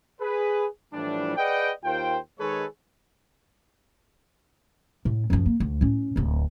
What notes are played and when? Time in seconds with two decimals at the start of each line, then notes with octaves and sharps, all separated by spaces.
0.21 G#4 B4
0.94 A2 E3 F3 G3 D4
1.37 G#4 B4 D5 D#5 F#5 G5
1.85 D#2 F4 A#4 C5 G5
2.39 D#3 G#3 G#4 A4 B4 C#5
5.05 A2
5.30 F#2 F3
5.46 A#3
5.60 D2
5.81 A2 C#4
6.16 D1 D2